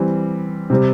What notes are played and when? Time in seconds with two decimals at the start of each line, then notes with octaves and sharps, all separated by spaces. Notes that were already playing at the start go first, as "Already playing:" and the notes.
Already playing: E3 G3 C4
0.70 C3 G3 C4